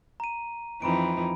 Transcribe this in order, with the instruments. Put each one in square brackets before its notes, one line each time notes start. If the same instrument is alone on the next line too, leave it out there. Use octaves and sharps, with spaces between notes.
[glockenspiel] A#5 D#7
[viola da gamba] F2 E3 D#4 [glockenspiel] A#5 B5 D7